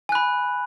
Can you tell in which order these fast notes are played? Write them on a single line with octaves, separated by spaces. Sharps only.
G#5 F#6 B5